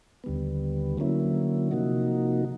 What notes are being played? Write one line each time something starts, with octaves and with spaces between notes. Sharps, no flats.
D#2 D3 G3 B3
D3 F#3 A#3 C#4 E4
C3 F3 A#3 D#4 F#4